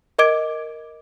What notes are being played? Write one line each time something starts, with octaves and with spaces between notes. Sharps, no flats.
A#4 D#5 D6 G#6 D7